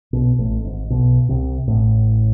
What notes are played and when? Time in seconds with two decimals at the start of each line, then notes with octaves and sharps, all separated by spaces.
0.13 B1 B2
0.39 A1 A2
0.64 G#1 G#2
0.90 B1 B2
1.29 C2 C3
1.68 A1 A2